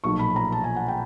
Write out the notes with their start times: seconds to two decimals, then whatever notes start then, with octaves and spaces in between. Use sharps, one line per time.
0.04 B1 A#2 F3 C#6
0.19 B5
0.36 A#5
0.52 A5
0.64 G#5
0.76 F#5
0.88 G5